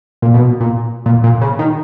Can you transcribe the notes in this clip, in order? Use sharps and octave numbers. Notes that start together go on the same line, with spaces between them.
A#2
B2
A#2
A#2
A#2
C#3
D#3